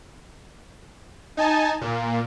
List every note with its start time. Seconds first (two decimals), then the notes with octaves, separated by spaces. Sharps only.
1.37 D#4 G#5 A5
1.81 A#2